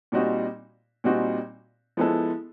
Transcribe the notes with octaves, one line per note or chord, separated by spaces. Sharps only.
A#2 G3 C4 D#4 F#4
A#2 G3 C4 D#4 F#4
F3 G#3 B3 E4 A4